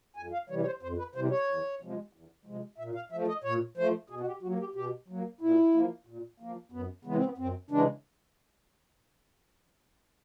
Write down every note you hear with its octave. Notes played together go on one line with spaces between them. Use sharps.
F2 G#5
F5
C3 E3 G3 C#5
C#5
C5
F2 C5
B4
C3 E3 G3 C5
C#5
E2
C3 F3 G#3
E2
C3 F3 G#3
A#2 E5
F5
F3 A3 E5
D#5
A#2 C#5
F3 A3 C5
B2 G#4
F#4
G4
F#3 F#4
A#3
G4
B2 G4
F#3 A#3
A#2 E4
F3 A#3
A#2
F3 A#3
F#2 B3
C#3 E3 G#3 B3
C4
B3
F#2 C4
C#3 E3 G#3 D4